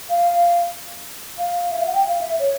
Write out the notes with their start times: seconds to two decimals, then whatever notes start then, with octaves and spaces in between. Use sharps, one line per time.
0.09 F5
1.38 F5
1.72 E5
1.79 F5
1.86 F#5
1.94 G5
2.07 F5
2.21 E5
2.39 C#5